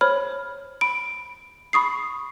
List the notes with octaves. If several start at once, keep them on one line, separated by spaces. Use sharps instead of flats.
C5 C#5 B5 F6
B5 D7
B5 C#6 D#6 C7